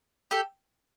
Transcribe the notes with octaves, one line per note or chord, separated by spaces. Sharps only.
G4 A4